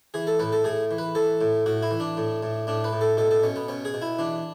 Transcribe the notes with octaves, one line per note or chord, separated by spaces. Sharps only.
E3 G#4
A4
A2 B4
A4
A2 G#4
E3
B4
E3 A4
A2
A2 F#4
E4
E3
D4
A2
A2
A2 D4
B4
A2
A4
B2 A4
A4
B2 C#4
B3
B2 C#4
G#4
B2
E4
E3 D4